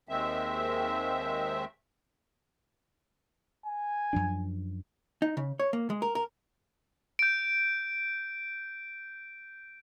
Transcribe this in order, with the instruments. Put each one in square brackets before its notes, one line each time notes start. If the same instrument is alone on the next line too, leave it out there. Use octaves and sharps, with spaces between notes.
[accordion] D#2 D#3 G#3 C4 E5
[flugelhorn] G#5
[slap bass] F#2 F3 D4
[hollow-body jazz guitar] D#4
C#3
C#5
A#3
G#3
A#4
A#4
[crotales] G6 D7